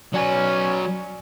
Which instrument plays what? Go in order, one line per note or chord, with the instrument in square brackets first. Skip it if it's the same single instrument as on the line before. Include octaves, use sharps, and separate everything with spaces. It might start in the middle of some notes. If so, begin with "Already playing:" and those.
[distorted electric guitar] F#3 B4 [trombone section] C#4 [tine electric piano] D5 G#5